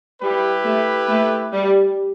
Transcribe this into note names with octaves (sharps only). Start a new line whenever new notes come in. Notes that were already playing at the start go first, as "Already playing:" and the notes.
G3 E4 G4 B4
A3
A3
G3